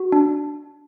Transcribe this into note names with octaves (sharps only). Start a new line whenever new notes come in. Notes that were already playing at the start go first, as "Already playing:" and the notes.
Already playing: F#4
D4